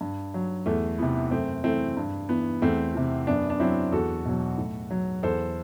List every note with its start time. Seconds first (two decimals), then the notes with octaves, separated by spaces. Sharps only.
0.01 G2
0.34 F#3
0.66 E2 A3
0.98 C3 E3 B3
1.31 F#2 A3 C4
1.64 E3 A3 C4
1.97 G2
2.29 E3 B3
2.62 E2 A3 C4
2.95 C3 E3
3.27 F#2 B3 D4
3.50 D4
3.60 F#3 C4 E4
3.92 E2 F#4 A4
4.26 B2 F#3
4.58 A2
4.91 F#3
5.23 E2 A4 C5